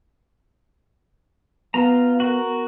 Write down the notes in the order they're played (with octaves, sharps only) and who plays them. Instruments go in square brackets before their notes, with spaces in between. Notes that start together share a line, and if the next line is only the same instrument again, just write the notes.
[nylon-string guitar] B3 [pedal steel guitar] F4 A#5
[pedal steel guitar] F#4 A#4